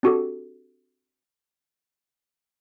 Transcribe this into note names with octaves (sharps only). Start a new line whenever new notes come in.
C4 D4 F#4 G4 A4